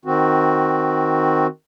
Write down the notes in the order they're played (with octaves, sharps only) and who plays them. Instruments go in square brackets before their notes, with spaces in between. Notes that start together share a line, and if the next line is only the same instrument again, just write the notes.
[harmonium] D#3 C4 F#4